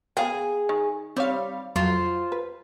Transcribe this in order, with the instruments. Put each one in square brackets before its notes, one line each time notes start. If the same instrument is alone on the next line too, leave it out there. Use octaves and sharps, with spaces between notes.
[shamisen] B3 F5 G5 [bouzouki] G#4 G#5
[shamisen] D#3
[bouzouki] G3 [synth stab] C4 C#5 F5
[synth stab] F2 F#3 [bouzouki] F4 C5
[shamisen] B4